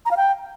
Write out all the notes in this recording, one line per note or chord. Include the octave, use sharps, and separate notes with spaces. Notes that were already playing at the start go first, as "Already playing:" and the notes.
A#5
F5
G5